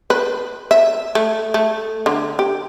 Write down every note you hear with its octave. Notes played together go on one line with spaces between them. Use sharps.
B4
E5
A3
A3
D3
G4